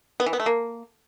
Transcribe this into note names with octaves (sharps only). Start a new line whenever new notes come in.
B3
E3
B3
A3
A#3